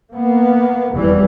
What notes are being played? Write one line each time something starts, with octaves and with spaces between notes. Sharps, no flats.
A#3 B3
F1 E2 E3 G3